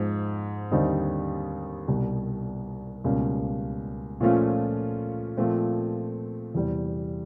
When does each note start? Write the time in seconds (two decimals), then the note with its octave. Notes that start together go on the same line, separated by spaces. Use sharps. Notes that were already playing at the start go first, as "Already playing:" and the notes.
Already playing: G#2 F3 G#3
0.71 D#2 D3 G3 C4 D#4
1.88 C2 B2 G3
3.04 C#2 B2 G3 A#3 C#4
4.21 A#2 F3 A3 C#4 F4
5.37 A#2 F3 A3 C4
6.54 E2 C3 E3 G3